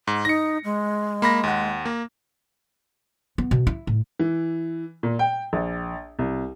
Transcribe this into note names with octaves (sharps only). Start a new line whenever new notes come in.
G#2
D#4 A#6 C#7
G#3
A#3 B5 A#6
D#2 F#5
A#3
B3
B2
E4
A2
E3
A#2
G5
A#1
C2